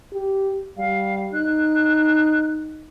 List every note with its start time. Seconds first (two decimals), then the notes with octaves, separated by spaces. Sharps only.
0.12 G4
0.78 G3 F5
1.34 D#4 F#6